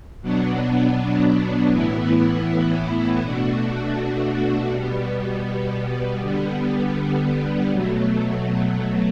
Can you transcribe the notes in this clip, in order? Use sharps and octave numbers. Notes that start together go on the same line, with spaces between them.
B2 F#3 B3 D4
A2 E3 B3 E4
B2 A3 D4 F#4
B2 G3 B3
D3 G3 B3
B2 F#3 A3